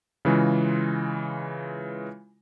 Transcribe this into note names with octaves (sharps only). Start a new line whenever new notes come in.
C#3 E3 G#3 F4